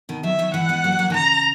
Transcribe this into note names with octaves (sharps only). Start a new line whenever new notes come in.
B2 D#3
D#3 F#3 E5
D#3 F#3
E3 G#3 F#5
G#3 B3
F#3 A#3
G#3
F#3 A#3
D#3
C#3 A#5